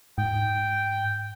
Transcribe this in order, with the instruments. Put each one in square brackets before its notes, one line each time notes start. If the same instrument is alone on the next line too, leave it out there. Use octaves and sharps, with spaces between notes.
[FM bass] G#2 [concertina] G5